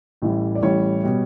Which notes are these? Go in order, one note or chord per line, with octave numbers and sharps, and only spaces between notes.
A1 A2 E3 G3
D5
A1 A2 E3 G3 C#5
B2 G3